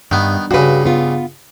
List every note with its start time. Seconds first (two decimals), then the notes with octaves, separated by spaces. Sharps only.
0.11 G2 D#3 B3
0.51 G2 C#3 F#4 B4
0.85 B3 F4